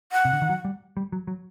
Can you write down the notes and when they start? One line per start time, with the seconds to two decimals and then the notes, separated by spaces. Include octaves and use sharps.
0.12 F#5
0.25 C3
0.33 D3
0.42 D#3
0.49 F#3
0.65 G3
0.97 G3
1.12 F#3
1.27 F#3